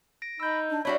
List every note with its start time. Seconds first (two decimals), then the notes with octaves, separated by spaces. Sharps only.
0.22 A#6 D7
0.40 D#4 B5 E6 G6
0.69 D4
0.85 G3 D4 E4 F#4 C#5 E5 B5